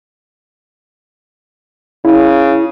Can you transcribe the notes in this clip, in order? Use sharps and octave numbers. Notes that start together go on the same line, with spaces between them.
C#3 E4